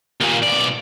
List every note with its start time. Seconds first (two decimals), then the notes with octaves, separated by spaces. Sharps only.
0.21 D#2 A#2
0.43 B1 D5